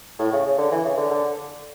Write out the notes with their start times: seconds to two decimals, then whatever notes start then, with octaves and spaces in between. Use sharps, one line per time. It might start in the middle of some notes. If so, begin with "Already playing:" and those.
0.19 A2
0.32 C#3
0.46 C#3
0.58 D3
0.71 E3
0.85 C#3
0.97 D3
1.11 D3